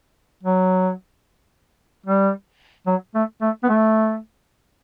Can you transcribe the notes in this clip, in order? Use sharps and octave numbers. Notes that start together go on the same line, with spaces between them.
F#3
G3
F#3
A3
A3
B3
A3